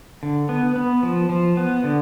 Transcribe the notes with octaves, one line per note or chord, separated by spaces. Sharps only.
D3
B3
B3
F3
F3
B3
D3